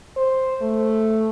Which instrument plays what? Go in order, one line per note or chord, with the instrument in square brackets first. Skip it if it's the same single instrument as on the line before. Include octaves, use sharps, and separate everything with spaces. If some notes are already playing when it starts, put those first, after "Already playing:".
[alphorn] C5
A3